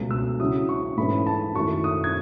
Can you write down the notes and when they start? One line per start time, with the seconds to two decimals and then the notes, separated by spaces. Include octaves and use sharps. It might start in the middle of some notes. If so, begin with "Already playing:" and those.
Already playing: C#2 B2 F#3 A3
0.11 E6
0.40 C#3 F#3 C#4 E4 D#6
0.69 C#6
0.97 G#2 E3 A3 C#4 B5
1.26 A5
1.55 F#2 D#3 A3 E4 C#6
1.84 D#6
2.04 G#6